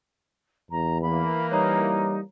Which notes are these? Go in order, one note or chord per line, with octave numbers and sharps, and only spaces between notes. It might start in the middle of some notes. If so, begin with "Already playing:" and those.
E2 A#5
E3 A#3 B5
G3 D#4 C#5 A#5